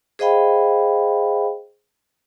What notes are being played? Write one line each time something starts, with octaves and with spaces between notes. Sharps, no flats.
G#4 C5 D#5 F5 G5 B5